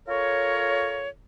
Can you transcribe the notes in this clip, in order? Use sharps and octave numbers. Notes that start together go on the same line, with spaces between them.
F4 A4 A#4 C#5